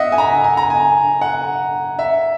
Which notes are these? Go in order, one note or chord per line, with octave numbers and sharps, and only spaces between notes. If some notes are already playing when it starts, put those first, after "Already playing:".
Already playing: D#5 E5 F#5
G#5
A#5
G#5
A#5
G#5
F#5
E5